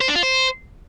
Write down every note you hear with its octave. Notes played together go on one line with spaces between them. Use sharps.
C5
D4
F4
C5